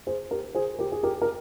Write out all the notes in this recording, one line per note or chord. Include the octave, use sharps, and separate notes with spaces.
G#4 C5
G4 A#4
G#4 C5
G4 A#4
G#4
G4 A#4
A#4